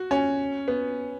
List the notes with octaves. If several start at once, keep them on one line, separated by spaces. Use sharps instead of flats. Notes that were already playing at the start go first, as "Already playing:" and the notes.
Already playing: F#4
C#4
B3